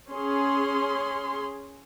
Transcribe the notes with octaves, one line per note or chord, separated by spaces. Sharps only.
C#4 G#4 C6